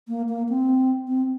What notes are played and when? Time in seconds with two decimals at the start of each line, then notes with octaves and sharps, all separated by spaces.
0.08 A#3
0.29 A#3
0.49 C4
1.08 C4